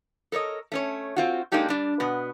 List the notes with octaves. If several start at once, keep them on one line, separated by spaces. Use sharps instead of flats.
A4 A#4 C#5 D#5
A3 C#4 C#5
C4 F4 F#4
G#3 A#3 D4 D#4 G4 A4
G3 D4
B2 B3